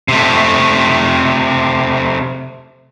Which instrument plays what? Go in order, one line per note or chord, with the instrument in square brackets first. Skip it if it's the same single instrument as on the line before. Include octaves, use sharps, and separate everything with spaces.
[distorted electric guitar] C3 A3